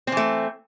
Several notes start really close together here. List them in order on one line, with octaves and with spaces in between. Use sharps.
C4 E3 A3